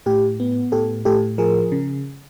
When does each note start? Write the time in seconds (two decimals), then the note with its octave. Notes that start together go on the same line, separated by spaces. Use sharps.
0.06 A2 G4
0.40 B3
0.72 A2 G4 A4
1.05 A2 G4 A4
1.38 F3 G#4 A#4
1.72 C#3